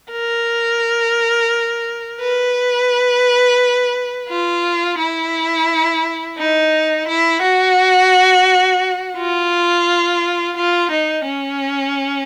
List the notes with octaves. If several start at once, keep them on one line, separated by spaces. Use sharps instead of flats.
A#4
B4
F4
E4
D#4
E4
F#4
F4
F4
D#4
C#4